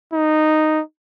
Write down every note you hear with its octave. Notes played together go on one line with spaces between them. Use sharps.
D#4